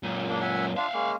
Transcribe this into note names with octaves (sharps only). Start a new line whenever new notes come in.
F#2 A#2
A#3 D4
E5 F#5 G#5
D4 F4 E5 F5
G#3 A#3 C#4